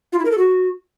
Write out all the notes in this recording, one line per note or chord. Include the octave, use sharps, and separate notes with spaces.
F4
E4
A#4
A4
F#4